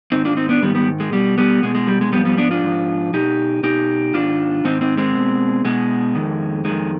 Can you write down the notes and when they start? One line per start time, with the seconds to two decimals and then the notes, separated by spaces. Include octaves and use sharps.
0.12 G#2 D#3 C4 D#4
0.25 D4 F4
0.37 C4 D#4
0.49 B3 D4
0.62 G#2 D#3 G3 B3
0.75 G3 B3
1.00 G#3
1.12 B2 G3
1.38 G3 B3
1.63 B2 G#3
1.75 G#3
1.87 G3
2.01 G#3
2.12 G#2 F3 G3 B3
2.25 G3 B3
2.37 B3 D4
2.51 D4 F4
2.63 G#2 F3
3.13 B2 D#4 G4
3.63 B2 D#4 G4
4.14 G#2 D#3 D4 F4
4.64 G#2 D#3 C4 D#4
4.81 C4 D#4
4.97 G#3 C4
5.14 B2
5.64 B2 G#3
6.15 F2 D#3
6.65 F2 D#3 G#3